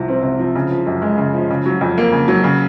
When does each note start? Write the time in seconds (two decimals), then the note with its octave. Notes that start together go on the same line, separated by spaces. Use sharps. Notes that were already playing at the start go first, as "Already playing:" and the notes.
Already playing: C2 C3 F3
0.08 C4
0.23 C3
0.39 F3
0.55 C#3
0.71 F3
0.86 F#2
1.02 G#3
1.18 C#3
1.34 F3
1.50 C#3
1.66 F#3
1.81 F2
1.98 A#3
2.12 C#3
2.28 F#3
2.44 C#3